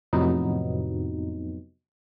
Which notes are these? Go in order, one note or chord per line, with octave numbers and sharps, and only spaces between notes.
F2 A2 C3 F#3 B3 D#4